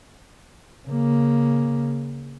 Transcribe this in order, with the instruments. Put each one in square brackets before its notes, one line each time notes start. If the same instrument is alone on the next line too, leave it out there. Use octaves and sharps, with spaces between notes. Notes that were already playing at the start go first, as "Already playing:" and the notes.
[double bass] C#3 A#3